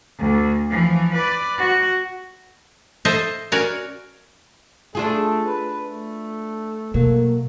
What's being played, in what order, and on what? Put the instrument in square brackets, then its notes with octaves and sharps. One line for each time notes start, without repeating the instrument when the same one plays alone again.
[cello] D2
E3 F3
B4 D5
F#4
[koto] A4 C5 D#5 E5
C#4 F#4 A#4 C#5 D5
[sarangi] A3 [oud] D4 F4 G#4
[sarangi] B4
A3
[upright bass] B2 [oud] F#3 [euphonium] A#3